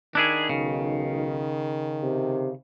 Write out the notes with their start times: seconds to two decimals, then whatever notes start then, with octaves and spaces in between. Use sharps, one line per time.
0.15 D#3 D4 E4 G#4
0.49 B1 C#3
2.03 C3